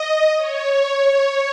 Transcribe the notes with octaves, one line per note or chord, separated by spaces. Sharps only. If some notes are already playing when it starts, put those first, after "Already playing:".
Already playing: D#5
C#5